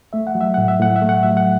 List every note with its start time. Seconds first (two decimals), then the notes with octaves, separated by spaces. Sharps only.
0.13 A3 E5
0.27 F#5
0.35 F#3
0.41 E5
0.54 A2 F#5
0.68 E5
0.79 A2 F#5
0.96 E5
1.02 A3
1.09 F#5
1.23 F#3 E5
1.37 F#5